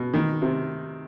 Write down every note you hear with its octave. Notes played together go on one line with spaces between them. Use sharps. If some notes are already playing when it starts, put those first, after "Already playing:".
Already playing: B2
D#3
C3